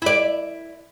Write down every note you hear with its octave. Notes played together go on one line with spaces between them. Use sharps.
E4 D5